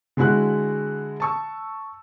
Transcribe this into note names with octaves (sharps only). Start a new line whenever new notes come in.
D3 G#3 E4 F#4 F#6
A5 C#6 E6